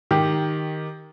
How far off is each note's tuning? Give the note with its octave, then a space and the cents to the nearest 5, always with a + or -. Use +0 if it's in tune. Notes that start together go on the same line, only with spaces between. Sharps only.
D#3 +0 G4 +0